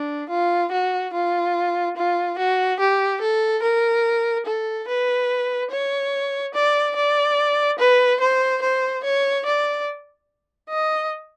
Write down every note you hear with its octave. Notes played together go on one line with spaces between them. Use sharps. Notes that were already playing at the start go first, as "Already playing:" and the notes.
Already playing: D4
F4
F#4
F4
F4
F#4
G4
A4
A#4
A4
B4
C#5
D5
D5
B4
C5
C5
C#5
D5
D#5